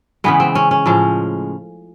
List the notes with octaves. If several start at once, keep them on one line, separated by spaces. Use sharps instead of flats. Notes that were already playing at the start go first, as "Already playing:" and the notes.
C#3 E3 G#3 B3
C4
C#4
C#4
A2 F3 G#3